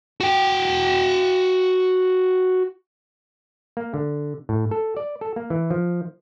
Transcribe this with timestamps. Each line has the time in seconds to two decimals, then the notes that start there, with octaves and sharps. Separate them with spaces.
0.20 F#4 G5
3.77 A#3
3.94 D3
4.49 A2
4.71 A4
4.97 D5
5.21 A4
5.36 A#3
5.50 E3
5.71 F3